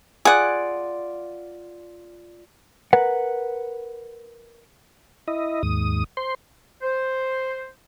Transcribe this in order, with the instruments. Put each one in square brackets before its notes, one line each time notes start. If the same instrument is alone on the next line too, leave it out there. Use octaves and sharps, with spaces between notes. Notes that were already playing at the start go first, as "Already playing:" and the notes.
[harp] F4 D5 [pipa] G#4 F#5
[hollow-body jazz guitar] A#4 B4 F#5
[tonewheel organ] E4 D#5
D#2 G#2 D#6
C5 C6
[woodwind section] C5